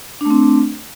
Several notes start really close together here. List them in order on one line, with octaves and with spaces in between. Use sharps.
D4 A3 C4